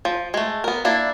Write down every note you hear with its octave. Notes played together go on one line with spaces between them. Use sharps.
F3
G#3 A3
B3 A#4
A#3 D4 E4